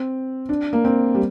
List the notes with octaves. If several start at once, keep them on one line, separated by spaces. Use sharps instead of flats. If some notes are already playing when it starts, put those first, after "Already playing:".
Already playing: C4
D4
A#3
C4
G3